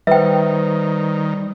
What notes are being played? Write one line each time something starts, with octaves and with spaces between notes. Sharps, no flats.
D#3 G3 B4 C5 E5 G5